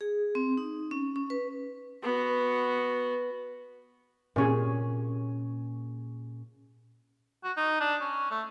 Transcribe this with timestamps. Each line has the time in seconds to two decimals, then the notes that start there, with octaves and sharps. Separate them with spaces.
0.01 G#4
0.35 C4
0.57 D#4
0.91 C#4
1.16 C#4
1.30 B4
2.03 B3 F#4
4.36 A#2 C#4 G#4
7.44 F#4
7.57 D#4
7.80 D4
8.01 C#4
8.31 A3